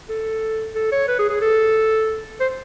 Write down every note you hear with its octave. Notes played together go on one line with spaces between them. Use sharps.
A4
A4
C#5
B4
G#4
G#4
A4
C5